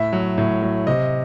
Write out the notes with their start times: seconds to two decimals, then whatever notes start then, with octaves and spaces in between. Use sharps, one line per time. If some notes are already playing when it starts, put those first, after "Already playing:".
Already playing: A2 E5
0.13 F#3
0.38 A2
0.62 F#3
0.87 C3 D#5